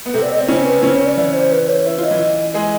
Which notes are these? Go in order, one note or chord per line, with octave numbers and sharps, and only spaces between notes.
B3
C3 C4 A4
D5
D#5
C4 D5
C#3 C#4 C5
B4
C#3 C#4 C5
C#5
D5
E3 E4 D5
C5
B4
C#5
E4
F4 D#5
E3 E4
G#3 G#4